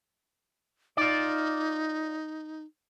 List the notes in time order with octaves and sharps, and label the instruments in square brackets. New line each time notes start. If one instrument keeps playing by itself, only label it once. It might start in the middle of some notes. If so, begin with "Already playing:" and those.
[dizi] D#4 [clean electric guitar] F4 D5